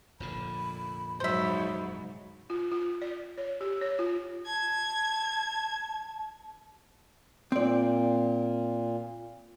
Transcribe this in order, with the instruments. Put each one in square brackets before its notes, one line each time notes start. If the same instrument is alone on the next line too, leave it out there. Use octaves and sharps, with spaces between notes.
[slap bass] F1 A#2 D3 [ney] B5
[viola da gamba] G#2 F#3 [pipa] C5 E5 [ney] B5
[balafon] F4
F4
D5
C#5
G4
C#5
F4
[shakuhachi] A5 [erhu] G#6
[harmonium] A#2 [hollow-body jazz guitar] C4 D5